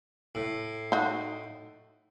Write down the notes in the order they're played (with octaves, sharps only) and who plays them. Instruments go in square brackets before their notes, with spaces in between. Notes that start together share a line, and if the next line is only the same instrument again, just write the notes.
[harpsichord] A2
[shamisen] D#4 F#4